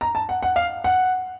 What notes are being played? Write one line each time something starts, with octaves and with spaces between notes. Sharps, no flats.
A#5
A5
F#5
F#5
F5
F#5